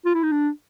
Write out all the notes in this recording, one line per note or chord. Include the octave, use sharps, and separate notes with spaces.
F4
E4
D#4
D4